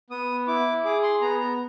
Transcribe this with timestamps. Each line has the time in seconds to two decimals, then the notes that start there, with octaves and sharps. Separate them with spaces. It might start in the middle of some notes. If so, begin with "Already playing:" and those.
0.10 B3 D#6
0.47 E4 D6
0.85 G#4 D6
1.03 C6
1.22 B3 A#5
1.40 A#5